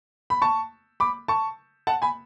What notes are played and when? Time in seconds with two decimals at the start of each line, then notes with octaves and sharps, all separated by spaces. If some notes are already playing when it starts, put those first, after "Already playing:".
0.30 B5
0.42 A5 C#6
1.00 B5 D6
1.28 A5 C#6
1.87 F#5 A5
2.02 G#5 B5